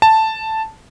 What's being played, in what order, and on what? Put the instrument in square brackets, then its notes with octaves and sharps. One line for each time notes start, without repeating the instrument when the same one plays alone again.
[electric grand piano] A5